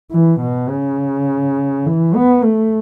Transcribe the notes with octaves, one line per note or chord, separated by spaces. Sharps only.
E3
B2
C#3
E3
B3
A3